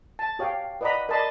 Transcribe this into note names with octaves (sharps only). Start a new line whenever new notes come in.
A5
G4 C#5 F5 G5
B4 D5 D#5 F#5 A#5 B5
A#4 D5 D#5 A5 B5 C6